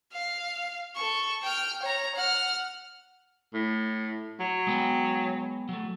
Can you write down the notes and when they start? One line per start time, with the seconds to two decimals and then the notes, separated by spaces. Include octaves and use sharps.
0.13 F5
0.96 A4 C#6
1.43 G5 F6
1.82 C#5 A#5
2.15 F#5 F6
3.54 A2
4.40 F#3
4.67 G#3 B3 G5
5.69 F#3 A3